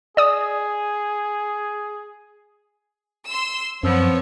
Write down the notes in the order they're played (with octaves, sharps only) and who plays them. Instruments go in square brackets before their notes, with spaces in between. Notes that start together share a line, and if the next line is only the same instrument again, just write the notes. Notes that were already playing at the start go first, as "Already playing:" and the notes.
[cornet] G#4 [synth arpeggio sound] D5 D#6
[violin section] C6 E6
[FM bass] F#2 [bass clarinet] F3 [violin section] B3 C#5 [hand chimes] C4 E6